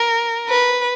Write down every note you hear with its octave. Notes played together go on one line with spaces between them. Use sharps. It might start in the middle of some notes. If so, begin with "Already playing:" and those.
Already playing: A#4
B4